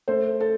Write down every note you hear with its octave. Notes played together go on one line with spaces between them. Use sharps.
A3 C5
A4